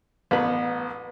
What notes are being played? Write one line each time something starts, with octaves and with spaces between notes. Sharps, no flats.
A1 B3 B4